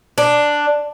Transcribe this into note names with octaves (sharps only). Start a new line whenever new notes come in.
D4